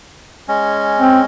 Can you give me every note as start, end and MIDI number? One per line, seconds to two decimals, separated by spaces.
0.48 1.25 56
0.48 1.25 61
0.99 1.20 60